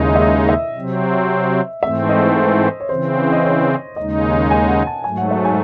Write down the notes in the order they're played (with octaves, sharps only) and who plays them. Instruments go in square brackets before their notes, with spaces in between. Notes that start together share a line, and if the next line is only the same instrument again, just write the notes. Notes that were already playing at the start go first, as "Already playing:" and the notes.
Already playing: [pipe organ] D#2 C#3 G#3 D#4 [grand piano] E4
[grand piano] E5
D#5
E5
[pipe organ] C3 F#3 C4
[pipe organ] G#2 E3 A3 C4 [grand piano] E5
[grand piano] D#5
C5
C#5
[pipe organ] C#3 E3 C4 [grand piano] C5
[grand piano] D#5
C#5
[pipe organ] D#2 C#3 G#3 D#4 [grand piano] D#5
[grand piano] G#5
F#5
A5
[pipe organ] G#2 F#3 A3 [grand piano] G#5
[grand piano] F#5
E5
G#5